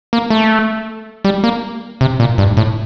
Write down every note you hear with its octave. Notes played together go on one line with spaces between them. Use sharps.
A#3
A3
G3
A#3
C3
A#2
G2
A2